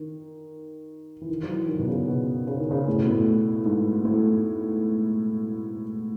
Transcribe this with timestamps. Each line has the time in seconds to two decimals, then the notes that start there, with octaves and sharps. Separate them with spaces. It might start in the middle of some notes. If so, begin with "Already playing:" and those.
Already playing: D#3
1.21 E3
1.29 D#3
1.43 F#3
1.49 E3
1.68 D#3
1.79 B2
1.88 C#3
2.08 B2
2.47 C#3
2.59 D#3
2.71 C#3
2.88 A2
2.98 B2
3.07 A2
3.66 G#2
4.05 A2